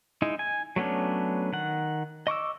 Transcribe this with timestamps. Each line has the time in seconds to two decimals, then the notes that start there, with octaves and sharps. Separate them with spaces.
0.22 G#3 D#4 E4
0.39 G#5
0.76 F#3 A3 B3 C#4 D4
1.53 D#3 F#5
2.27 D#5 C#6 D6 E6